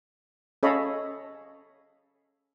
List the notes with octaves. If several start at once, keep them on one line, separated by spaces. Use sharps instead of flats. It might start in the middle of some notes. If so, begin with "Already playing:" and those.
C#4 A4 C#5 D#5 F5 B5